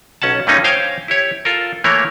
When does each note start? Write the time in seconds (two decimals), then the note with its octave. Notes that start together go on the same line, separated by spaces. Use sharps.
0.22 B1 C#4 F#5 A5
0.47 G2 A3 A#3 C#4 D#4 F4
0.64 C5 C#5 F5 G5 G#5
1.08 E4 G4 C#5
1.45 F4 A4 A#4
1.84 E3 A3 A#3 A#4 C#5